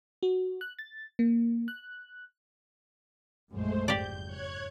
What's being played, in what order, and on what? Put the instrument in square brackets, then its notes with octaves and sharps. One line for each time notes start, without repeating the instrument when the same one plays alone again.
[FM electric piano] F#4
F#6
A6
A#3
F#6
[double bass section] A#1 F#2 [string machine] G#3 A3 C5
[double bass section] F#1 F2 G#2 [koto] G4 D5 [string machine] G6
[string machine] C#5 F#6 G#6